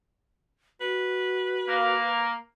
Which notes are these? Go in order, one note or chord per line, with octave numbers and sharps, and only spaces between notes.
F#4 B4
A#3